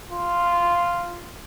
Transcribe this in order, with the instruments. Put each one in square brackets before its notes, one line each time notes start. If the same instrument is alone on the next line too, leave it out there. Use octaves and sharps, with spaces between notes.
[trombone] F4